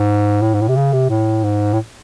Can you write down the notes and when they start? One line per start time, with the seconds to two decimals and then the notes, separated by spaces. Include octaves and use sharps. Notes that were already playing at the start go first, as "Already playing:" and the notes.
Already playing: G#2
0.42 A2
0.54 G#2
0.62 A2
0.68 C3
0.76 C#3
0.93 C3
1.10 A2
1.44 G#2
1.73 A2